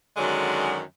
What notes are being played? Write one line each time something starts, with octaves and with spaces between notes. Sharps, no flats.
F#2 D3 D#3 F#3 G#3